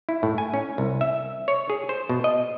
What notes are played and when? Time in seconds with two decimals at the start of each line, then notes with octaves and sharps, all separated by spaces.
0.09 E4
0.23 A2
0.38 G#5
0.54 C#4
0.78 C2
1.01 E5
1.48 C#5
1.70 G#4
1.89 C5
2.09 B2
2.24 D#5